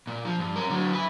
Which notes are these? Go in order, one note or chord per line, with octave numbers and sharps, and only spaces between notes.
A#2
F3
G2
C#4 A#4
D3 F#3
E4 B4